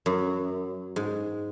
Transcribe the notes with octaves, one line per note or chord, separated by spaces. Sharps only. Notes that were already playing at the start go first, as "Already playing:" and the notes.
F#2
G#2